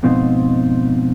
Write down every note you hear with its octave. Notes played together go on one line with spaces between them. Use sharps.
F2 G#2 B2 C4 D#4 F4